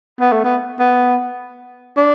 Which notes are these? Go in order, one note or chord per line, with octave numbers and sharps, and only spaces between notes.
B3
A3
B3
B3
D4